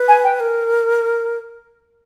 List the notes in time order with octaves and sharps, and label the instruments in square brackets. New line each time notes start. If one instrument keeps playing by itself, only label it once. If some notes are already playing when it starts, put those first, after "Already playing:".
Already playing: [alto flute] B4
[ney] G#5
G5
[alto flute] A#4